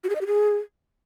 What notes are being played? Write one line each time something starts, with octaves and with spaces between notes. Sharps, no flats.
F#4
G#4
D#5
G4
G#4